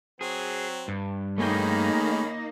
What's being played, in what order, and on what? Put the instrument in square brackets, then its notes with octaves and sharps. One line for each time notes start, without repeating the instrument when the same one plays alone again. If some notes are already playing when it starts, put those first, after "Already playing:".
[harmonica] F#3 C4 [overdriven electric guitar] G#4
[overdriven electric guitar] G2
[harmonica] D#3 C#4 B5 [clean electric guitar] A3 G#4 G5 [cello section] A#3 D#4